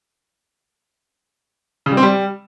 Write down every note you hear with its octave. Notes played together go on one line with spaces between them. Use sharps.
C#3
G3
C4
G3